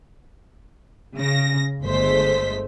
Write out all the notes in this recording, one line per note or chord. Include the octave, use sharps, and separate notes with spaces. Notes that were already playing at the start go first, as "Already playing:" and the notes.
C#3 A#6
G1 G#3 A3 C5 B6